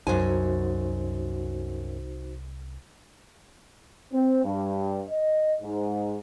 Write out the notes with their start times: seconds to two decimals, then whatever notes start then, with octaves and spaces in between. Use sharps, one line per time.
0.07 C2 F#2 D#4 F#4 C5 G#5
4.13 C4
4.45 G2
5.09 D#5
5.61 G#2